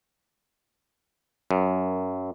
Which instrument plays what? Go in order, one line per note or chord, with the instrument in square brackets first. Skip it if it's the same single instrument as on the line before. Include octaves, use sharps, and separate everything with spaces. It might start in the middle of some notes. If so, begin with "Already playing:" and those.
[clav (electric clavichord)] F#2